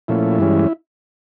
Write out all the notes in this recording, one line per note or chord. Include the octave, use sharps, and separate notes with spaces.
A#2 F3 A3 C#4 E4
G2 E3 G#3 C#4